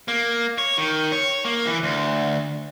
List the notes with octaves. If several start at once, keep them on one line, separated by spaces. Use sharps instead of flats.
A#3
C#5
D#3
C#5
A#3
E3
D2